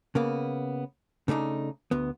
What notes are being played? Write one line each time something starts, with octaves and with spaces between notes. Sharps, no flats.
C#3 A#3 B3
C#3 A3 D4 D#4
D2 B3